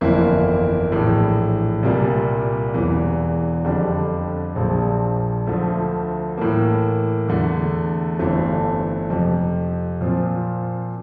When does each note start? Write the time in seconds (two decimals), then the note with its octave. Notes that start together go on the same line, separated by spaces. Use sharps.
0.01 G1 F2 E3 A#3 E4
0.92 A#1 A2 E3
1.83 C2 A#2 G3 A#3
2.74 E1 E2 E3
3.64 F2 D3 G3 D4
4.56 A#1 A#2 F3
5.46 D2 D3 F3 A3
6.37 A2 E3 A#3
7.28 E2 D3 A3
8.19 G1 G2 E3 A3 C4
9.10 F2 C3 F3
10.01 A#2 F3 C4 F4